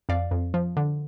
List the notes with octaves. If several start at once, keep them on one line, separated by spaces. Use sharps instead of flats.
F2 D5 F5
F2
F3
D3